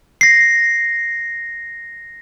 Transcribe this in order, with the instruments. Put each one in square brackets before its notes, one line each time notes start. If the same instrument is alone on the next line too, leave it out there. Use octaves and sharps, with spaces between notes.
[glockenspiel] A#6 C7